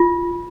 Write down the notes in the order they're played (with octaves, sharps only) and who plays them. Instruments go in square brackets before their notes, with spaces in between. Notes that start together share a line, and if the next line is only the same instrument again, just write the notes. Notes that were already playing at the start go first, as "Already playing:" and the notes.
Already playing: [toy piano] F4